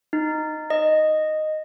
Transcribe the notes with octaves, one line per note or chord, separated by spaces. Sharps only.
D#4
D#5